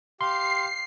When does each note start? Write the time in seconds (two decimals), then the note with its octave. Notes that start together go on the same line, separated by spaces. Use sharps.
0.21 G4 F5 C6 C7